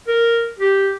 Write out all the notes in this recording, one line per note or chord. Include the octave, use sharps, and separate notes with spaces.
A#4
G4